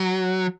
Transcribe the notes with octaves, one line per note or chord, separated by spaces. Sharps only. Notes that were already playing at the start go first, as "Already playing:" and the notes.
Already playing: F#3